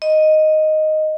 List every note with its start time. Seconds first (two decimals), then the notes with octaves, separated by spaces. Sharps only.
0.02 D#5